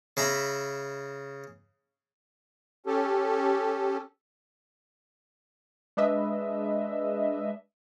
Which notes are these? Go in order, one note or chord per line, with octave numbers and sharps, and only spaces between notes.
C#3 E5 A#5 B5
C#4 G4 A4
G#3 D4 B4 D#5 E5